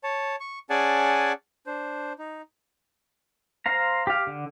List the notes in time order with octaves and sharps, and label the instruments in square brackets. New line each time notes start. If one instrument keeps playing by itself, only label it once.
[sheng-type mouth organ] C#5 A5
C#6
C#4 G#4 D5 F#5 G#5 A5
D4 C5
D#4
[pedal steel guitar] C5 F5 A#5
G4 F5
D3